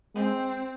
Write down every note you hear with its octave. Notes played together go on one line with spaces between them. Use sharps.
G#3 C4